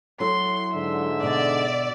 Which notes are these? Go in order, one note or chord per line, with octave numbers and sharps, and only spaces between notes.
F#3 E4 A4 C6
G#2 D3 E5
B2 D5 D#5